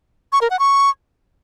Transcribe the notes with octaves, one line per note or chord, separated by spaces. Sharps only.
C#6
A#4
F#5
C#6